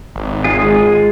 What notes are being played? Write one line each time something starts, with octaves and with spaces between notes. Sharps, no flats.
G#1
G#3 F4 G#4